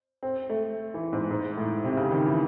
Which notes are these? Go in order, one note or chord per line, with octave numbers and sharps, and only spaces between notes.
C4
A3
E3
G#2
G#2
A2
C3
C#3
D#3
E3